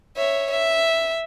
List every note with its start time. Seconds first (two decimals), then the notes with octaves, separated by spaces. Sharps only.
0.17 C#5 E5
0.51 E5